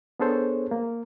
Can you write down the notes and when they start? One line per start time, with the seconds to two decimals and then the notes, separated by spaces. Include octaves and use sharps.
0.20 B3 D4 G#4 A4 C5 C#5
0.71 A#3